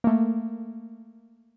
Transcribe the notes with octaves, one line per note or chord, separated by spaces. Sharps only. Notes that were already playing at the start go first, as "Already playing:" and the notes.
A3 A#3